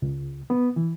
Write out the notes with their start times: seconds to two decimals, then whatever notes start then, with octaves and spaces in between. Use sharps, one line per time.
0.02 C#2
0.50 B3
0.76 E3